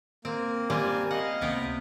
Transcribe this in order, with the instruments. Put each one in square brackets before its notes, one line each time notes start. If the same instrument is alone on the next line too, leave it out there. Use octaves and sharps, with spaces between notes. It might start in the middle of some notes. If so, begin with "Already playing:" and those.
[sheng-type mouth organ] A#3 [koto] C4
[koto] G3 C4 F4 [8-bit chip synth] G4 [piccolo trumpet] G#5
[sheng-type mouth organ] D#5 [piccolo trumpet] F5 [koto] F#5
[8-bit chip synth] C#2 A#3 [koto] C3 B3 G5